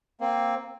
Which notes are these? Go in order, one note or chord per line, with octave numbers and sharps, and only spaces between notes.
A#3 C4